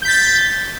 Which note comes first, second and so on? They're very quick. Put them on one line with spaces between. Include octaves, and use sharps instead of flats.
G6 B6 A6